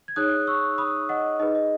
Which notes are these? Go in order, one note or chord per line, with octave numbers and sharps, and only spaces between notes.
G#6
D#4 G#4 C#5 D#6 F#6
C#6 E6
B5 D#6
D#5 F#5
D#4 G#4 B4 D#5
D#5